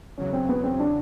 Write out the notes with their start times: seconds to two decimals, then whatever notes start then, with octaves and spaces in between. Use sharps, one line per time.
0.18 E2 C#3 F#3 C#4
0.33 C4
0.49 B3
0.64 C4
0.80 D4